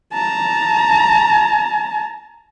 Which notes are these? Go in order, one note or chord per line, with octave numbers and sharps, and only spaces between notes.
A5 A#5